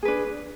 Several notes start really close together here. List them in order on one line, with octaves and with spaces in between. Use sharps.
G#4 B4 D4